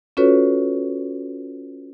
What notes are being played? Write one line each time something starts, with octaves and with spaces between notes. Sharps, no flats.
C#4 F4 F#4 A4 B4 C#5